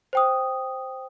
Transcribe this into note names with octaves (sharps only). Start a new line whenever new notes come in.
C5 G5 D#6